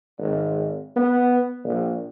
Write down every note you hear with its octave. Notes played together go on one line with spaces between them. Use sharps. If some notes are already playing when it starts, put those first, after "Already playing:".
G#1
B3
A#1